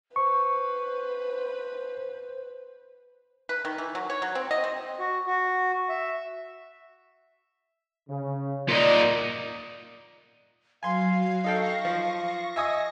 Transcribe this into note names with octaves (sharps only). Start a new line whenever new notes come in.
B4 C5 C#6
B4
D#3
E3
F#3
C#5
F#3
C4
D#5
C4
F#4
F#4
E5
C#3
A#2 A#3 D#4 D5
F#3 F5 G#5 C6
D#4 A4 G5 C#6 A#6
F3
D#5 E5 G#5 D#6